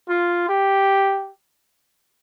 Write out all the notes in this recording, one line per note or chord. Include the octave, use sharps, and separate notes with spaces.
F4
G4